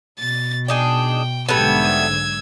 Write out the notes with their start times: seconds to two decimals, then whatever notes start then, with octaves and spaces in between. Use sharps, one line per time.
0.19 B2 A6
0.68 D4 D#4 G#4 G5
1.49 B1 G#2 D3 G3 A3 B3 E6 G#6